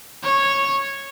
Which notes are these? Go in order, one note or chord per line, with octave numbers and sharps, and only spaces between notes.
C#5